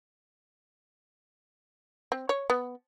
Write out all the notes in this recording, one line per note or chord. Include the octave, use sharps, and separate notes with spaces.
C4
C#5
B3